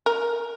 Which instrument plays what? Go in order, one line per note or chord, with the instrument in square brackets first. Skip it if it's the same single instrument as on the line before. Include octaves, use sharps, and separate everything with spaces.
[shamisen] A#4